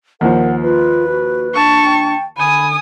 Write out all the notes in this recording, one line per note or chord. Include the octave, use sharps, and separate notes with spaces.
D#2 F3 A#4 F#5
F4 B4
F#4
D4 A5 C#6
G5
D3 G#5 B5 D#6